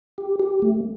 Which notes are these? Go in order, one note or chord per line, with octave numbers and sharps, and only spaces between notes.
G4
G4
A3